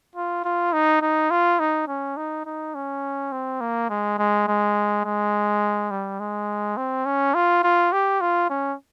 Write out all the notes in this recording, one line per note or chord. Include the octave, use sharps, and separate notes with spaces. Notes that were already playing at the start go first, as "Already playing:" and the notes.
F4
F4
D#4
D#4
F4
D#4
C#4
D#4
D#4
C#4
C4
A#3
G#3
G#3
G#3
G#3
G3
G#3
C4
C#4
F4
F4
G4
F4
C#4